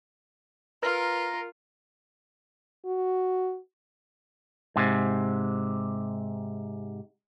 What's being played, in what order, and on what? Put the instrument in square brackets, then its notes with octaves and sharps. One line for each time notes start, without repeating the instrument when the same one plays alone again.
[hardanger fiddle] F4 [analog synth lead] A#4 [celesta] B4
[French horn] F#4
[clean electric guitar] G#2 C3